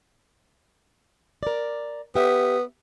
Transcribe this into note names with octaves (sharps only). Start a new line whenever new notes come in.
A#4 D5
B3 G4 E5